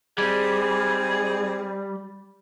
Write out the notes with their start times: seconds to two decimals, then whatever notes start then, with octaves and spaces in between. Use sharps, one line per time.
0.18 G3 C4 D#4 G#4